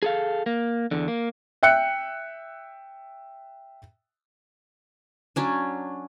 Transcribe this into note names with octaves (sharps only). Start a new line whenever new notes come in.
G#4 A4 F5
A#3
E2 D3
A#3
E5 G5 F#6 C#7
F#3 C#4 D4